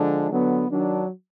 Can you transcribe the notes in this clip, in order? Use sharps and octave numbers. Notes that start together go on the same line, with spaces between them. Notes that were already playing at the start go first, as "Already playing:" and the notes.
Already playing: D3 F3 G#3 D4
D3 F#3 B3
D#3 F#3 D4